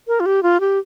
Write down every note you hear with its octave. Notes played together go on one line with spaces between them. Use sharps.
A#4
F4
G4
F4
G4